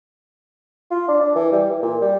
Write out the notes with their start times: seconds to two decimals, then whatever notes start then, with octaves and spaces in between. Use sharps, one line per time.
0.91 F4
1.08 D4
1.21 D4
1.35 E3
1.52 G3
1.70 E3
1.82 A#2
2.01 G3